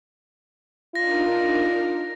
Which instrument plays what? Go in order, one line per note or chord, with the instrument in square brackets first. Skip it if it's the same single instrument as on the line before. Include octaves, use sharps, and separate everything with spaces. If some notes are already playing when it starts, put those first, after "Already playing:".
[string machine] D4 D#4 A#4 [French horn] F4 [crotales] A#6